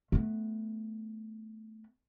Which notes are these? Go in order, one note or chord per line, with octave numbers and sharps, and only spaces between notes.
A3 B3